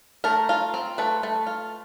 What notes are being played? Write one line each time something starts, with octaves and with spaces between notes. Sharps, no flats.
A3 A#4
F4
C4
A3 B4
A3
F4